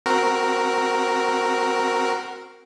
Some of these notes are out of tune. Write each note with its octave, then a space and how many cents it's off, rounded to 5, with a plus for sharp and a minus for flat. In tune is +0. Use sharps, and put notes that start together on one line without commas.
C4 +0 F#4 +0 A#4 +0